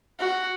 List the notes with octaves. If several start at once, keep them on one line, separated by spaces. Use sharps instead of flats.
F#4